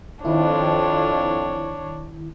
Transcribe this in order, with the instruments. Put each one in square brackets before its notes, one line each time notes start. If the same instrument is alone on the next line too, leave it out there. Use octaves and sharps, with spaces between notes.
[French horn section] F2 [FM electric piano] D#3 E4 [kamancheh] D4 C#5